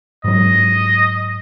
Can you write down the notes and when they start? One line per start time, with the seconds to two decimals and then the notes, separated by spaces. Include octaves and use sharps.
0.24 G#2 F#3 D#5